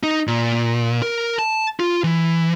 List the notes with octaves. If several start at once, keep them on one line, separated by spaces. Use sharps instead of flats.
D#4
A#2
A#4
A5
F4
E3